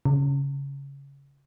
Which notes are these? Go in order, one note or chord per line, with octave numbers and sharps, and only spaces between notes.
C#3